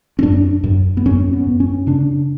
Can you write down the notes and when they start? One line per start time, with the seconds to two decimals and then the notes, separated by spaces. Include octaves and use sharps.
0.19 C#4
0.23 F#2 D4
0.64 F#2
0.97 B3
1.05 F#2 C#4
1.33 B3
1.47 F#2
1.60 C#4
1.87 C#3 D4